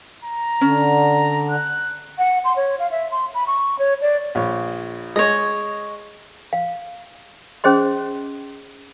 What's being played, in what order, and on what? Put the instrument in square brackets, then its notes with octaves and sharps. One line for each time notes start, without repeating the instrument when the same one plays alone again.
[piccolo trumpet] A#5
[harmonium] D3 [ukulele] C#4
[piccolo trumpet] F#6
[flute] F#5
C6
C#5
F5
E5
C6
B5
C#6
C#5
D5
[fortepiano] A#1 C#5
[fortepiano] G#3 [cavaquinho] C#5 D#5
[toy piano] F5
C#4 G#4 C5 D#5 C6